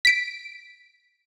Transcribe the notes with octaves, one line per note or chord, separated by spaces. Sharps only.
B6 D7